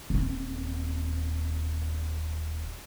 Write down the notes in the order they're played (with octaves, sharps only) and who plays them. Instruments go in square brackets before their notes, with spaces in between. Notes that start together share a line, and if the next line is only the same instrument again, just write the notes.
[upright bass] D#1 C4